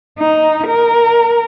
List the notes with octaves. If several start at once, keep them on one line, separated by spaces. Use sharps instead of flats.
D#4
A#4